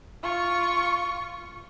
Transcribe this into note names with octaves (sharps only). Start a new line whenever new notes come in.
F4 C#6